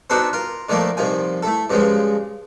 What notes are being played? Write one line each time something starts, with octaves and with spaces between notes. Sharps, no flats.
B3 D4 D#4 F#4 A4 C5
F4 A#4
D3 D#3 F3 A3 A#3
C2 D#3 F3 G#5
A3 E4 A4
G2 C#3 F3 G#3